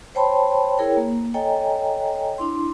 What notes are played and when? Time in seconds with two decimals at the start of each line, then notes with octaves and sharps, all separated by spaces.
0.15 C5 C#5 G5 A5 B5 C6
0.78 E4 G#4 A#4 C#5 G5
0.97 A#3
1.34 A4 C#5 D#5 G5 G#5 A#5
2.38 D4 E4 C6